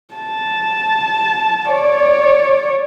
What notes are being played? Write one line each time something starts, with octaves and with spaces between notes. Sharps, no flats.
A5
C#5 D5